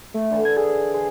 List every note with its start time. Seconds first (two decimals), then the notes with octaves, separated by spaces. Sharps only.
0.14 A3
0.30 D3 E3 A5
0.45 G#6
0.57 G#4
0.94 G#4 C5